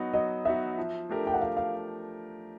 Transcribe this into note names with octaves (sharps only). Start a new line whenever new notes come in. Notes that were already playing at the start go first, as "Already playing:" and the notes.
Already playing: F#3 B3 D#4 F#4
F#3 D#5
B3 D#4 F#4 E5
F3
A3 D4 G4 A#4
G5
F#5
F3 F5
F5